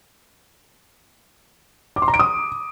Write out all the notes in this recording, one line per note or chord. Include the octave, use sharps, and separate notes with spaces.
D6
C6
A#5
D7
D#6